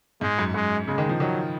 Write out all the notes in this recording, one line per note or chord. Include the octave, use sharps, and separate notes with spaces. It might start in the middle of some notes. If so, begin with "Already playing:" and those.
G#2 G#3
F#2
F#2 G#3
C#3 G#3
D#3
F3
D#3 F#3